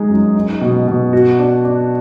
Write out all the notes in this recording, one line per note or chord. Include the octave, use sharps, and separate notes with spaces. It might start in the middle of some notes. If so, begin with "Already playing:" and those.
Already playing: G#3 D#4
F#2
D#4
B2
B2
F#4
D4
D4